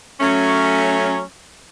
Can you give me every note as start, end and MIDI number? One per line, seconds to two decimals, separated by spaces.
0.20 1.21 54
0.20 1.21 57
0.20 1.21 61